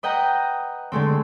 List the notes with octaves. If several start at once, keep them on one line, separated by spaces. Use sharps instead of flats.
B4 D#5 F#5 G5 A#5
D3 G#3 A3 C4